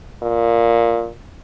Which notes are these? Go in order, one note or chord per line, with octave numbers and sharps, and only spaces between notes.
A#2